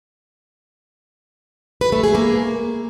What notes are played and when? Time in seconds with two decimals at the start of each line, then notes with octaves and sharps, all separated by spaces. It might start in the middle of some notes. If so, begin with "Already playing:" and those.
1.81 B4
1.92 A3
2.04 G#4
2.15 A#3